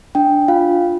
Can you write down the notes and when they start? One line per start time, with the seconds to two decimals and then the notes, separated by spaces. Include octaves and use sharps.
0.15 D4 G5
0.48 F4 F5